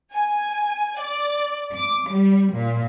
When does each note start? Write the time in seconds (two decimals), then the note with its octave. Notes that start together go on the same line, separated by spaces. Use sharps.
0.13 G#5
0.99 D5
1.75 D6
2.13 G3
2.54 A#2